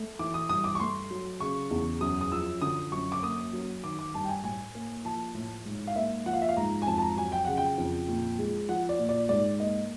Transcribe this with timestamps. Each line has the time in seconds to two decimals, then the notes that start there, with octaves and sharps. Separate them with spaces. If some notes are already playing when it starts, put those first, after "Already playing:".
Already playing: A3
0.19 E3 D6
0.34 D#6
0.49 G2 D#6
0.64 D6
0.75 C#6
0.80 A3 C6
1.10 F#3
1.40 C#3 C#6
1.71 E2
2.01 F#2 D#6
2.21 D#6
2.32 F3 E6
2.62 D3 D#6
2.92 F#2 C#6
3.12 D6
3.22 A#3 D#6
3.53 F#3
3.83 D#3 D6
3.99 D6
4.14 G2 A5
4.24 G5
4.29 G#5
4.43 A2 G#5
4.75 A#3
5.05 F3 A5
5.35 A2
5.66 G#2
5.87 F5
5.95 A#3 E5
6.26 F3 F#5
6.33 F5
6.41 E5
6.49 F5
6.57 G#2 A#5
6.82 G#5
6.87 F2 A5
6.98 A5
7.02 A#5
7.17 F#3 G#5
7.32 G5
7.45 C#3 F#5
7.57 G5
7.78 F2
8.08 A#2
8.39 G#3
8.69 F3 F#5
8.89 D5
8.99 A#2
9.09 D5
9.29 G#2 D5
9.60 A#3 D#5